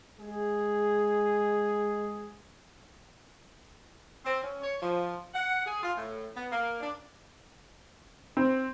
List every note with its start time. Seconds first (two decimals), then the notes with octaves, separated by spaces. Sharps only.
0.19 G#3 G#4
4.25 C4
4.43 C#4
4.62 C#5
4.81 F3
5.35 F#5
5.66 G#4
5.83 F4
5.97 A2
6.35 B3
6.51 A#3
6.81 D4
8.37 C4